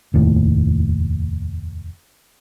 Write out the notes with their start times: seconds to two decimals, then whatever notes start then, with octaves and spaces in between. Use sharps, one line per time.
0.14 F1 D#2 A2